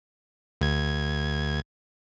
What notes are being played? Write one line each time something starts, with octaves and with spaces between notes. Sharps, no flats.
D2 G#6